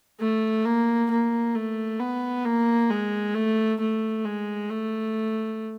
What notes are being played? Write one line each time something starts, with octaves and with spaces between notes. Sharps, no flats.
A3
A#3
A#3
A3
B3
A#3
G#3
A3
A3
G#3
A3